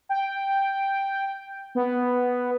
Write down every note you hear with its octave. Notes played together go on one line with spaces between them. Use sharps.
G5
B3